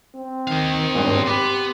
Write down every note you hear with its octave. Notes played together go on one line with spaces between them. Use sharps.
C4
D#3 D#4 F5
D#1 G#1 G2 C5
B3 G4 B5 D6